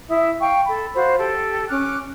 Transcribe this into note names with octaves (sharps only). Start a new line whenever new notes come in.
E4 E5 D#6
F5 G5 C#6
A4 B5
F4 F#4 C5 B5
G4 A4
C#4 D6 F6 F#6